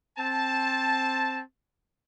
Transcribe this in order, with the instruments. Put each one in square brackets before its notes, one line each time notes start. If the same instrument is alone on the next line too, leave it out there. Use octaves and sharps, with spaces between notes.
[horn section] C4 A5